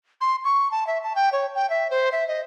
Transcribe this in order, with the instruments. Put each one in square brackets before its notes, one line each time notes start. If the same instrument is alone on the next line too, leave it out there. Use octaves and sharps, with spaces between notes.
[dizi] C6
C#6
A5
E5
A5
G5
C#5
G5
E5
C5
E5
D#5